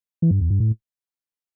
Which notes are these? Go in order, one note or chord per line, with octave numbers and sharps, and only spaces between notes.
E3
G2
E2
G2
A2